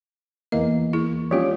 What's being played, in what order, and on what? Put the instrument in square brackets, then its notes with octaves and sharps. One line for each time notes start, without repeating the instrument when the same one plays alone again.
[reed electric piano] E2 E3 A#3 [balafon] D#5
[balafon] E4 G#4
[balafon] F3 G#3 F4 [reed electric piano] C#4 G4 C#5